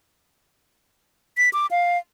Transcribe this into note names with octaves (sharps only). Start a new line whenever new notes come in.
B6
D6
F5